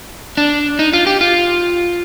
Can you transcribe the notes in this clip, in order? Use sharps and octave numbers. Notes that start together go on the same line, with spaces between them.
D4
D#4
F4
G4
F4